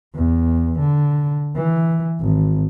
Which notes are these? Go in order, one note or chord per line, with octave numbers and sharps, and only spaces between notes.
E2
D3
E3
G#1